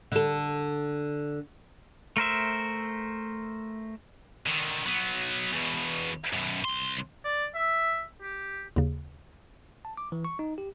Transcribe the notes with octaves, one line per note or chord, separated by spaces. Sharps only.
D3 A4
A3 A#4 C5 E5
D3 D#3
F#3 B3
E2 B2
F#2 B2
C2 C6
D5
E5
G4
D#2 C#3
A5
D6
E3
C#6
D#4
G4